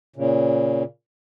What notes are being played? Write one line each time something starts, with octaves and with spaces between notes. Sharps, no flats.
A#2 C#3